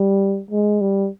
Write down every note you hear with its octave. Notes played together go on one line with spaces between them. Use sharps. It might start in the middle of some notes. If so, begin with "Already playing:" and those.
Already playing: G3
G#3
G3